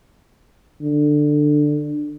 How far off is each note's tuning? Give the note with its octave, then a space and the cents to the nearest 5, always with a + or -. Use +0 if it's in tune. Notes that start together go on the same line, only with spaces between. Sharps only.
D3 +15